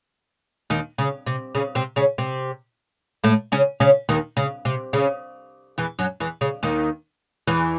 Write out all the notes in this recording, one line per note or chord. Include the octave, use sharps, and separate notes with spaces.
D#2 D#3
C#3
C3
C#3
C3 C4
C#3 C#4
C3 C4
A2 A3
C#3 C#4
C#3 C#4
D#2 D#3
C#3
C3
C#3
E2 E3
F#2 F#3
E2 E3
C#3
D#2 D#3
E2 E3